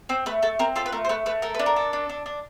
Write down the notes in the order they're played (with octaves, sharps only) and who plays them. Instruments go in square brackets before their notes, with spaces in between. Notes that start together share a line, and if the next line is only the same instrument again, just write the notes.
[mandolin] C4 C5
A3 B4
A3 A4
C4 A#4
F4 A4
B4
A3 A#4
C5
A3 B4
A3 B4
A4 A#4
D4 B4
A#4
A4
D4
D4
D4